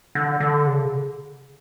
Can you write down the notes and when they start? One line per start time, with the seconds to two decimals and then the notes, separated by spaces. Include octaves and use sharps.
0.15 D3
0.40 D3
0.66 C#3